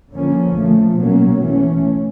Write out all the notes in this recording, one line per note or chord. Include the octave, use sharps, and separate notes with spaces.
D3 F3 A#3 C#4
A#2 F3 A3
B2 F#3 A#3 C#4
E3 A3 C#4